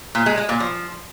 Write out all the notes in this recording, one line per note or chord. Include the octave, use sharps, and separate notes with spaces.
A#2
G#3
G#3
A#2
F3